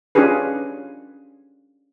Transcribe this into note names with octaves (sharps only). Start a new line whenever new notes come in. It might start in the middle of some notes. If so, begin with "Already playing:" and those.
C#4 D4 F4 G4 G#4 B4